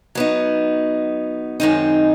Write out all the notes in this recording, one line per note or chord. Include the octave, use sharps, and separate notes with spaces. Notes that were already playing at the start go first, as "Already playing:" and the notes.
F#3 B3 D#4
F#2 D#3 G#3 C4 D#4